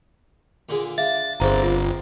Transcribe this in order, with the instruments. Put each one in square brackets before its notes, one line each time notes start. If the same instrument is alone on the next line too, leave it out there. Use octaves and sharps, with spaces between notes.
[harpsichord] A#2 D3 G#4
[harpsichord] D4 [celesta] E5 F5 [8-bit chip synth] A6
[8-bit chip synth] G1 [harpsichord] A#3 C4 [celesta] G#4 C5 A#5
[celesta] F4